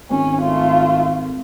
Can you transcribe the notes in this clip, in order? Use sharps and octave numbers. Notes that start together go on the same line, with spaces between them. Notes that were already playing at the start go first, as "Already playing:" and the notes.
G#1 C#4
A3 F4